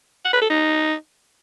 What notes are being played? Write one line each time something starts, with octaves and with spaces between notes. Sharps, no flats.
F#5
B4
A4
D#4